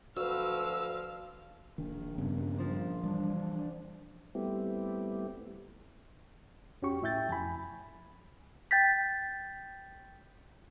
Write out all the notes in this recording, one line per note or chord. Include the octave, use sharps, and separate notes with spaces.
D2 F3 F#4 B4 F5 E6
D1 A#1 D#3
G2 C#3 B3 C#4
F3 C5
E3 G3 D4
G3 A3 B3 C4 E4 G4
F2 C#4 F#4 G4 C#6
A2 E4 E5 G5 G6 A6
F2 G#5 B5
G5 G6 A6 B6